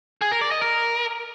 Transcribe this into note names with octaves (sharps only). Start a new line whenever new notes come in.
G#4
A#4
D5
D#5
A#4